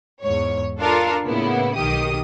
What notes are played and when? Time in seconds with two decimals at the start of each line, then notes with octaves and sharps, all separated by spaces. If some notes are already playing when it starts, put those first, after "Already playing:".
0.24 E2 G#2 C#5
0.81 D4 F4 A4 A#4 F5
1.27 A2 C#3 A#3 B3 E4
1.76 B1 D#3 G4 D#6